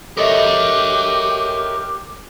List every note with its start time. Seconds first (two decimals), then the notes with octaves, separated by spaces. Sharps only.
0.17 G4 A4 A#4 C#5 D#5 E5